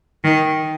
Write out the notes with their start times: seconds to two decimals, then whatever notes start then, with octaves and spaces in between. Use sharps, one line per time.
0.24 D#3